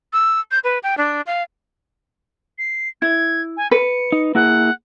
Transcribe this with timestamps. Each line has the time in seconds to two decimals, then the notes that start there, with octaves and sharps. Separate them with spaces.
0.13 E6
0.51 G6
0.64 B4
0.83 G5
0.98 D4
1.27 F5
2.58 C7
3.02 E4 G#6
3.57 G#5
3.71 B4 C#7
4.12 D#4
4.35 A#3 E4 G#4 F#5